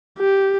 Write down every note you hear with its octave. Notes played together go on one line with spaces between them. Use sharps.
G4